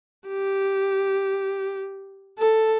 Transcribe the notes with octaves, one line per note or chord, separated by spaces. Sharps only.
G4
A4